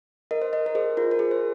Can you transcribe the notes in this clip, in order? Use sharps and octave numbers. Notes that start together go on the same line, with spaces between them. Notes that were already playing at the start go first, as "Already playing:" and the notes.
A#4 D#5
C5
A#4 D#5
A#4
G#4 C5
F4 A#4
A#4
G#4
C5